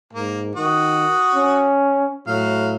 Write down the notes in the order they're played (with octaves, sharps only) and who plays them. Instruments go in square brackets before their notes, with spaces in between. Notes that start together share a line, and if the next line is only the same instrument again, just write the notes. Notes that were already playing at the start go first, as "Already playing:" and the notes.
[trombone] G#2 [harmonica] A#3
[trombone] D#3 [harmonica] F#4 D#6
[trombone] C#4
[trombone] A2 [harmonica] F#3 F5